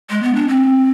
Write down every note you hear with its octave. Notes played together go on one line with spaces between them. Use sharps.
G#3
B3
D4
C4